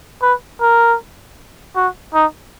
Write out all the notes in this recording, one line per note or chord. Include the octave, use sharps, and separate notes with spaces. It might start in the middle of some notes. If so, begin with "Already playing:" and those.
B4
A#4
F#4
D#4